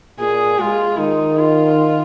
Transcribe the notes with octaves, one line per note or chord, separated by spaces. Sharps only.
A#2 G#4
G#3 F4
D#3 D#4
F4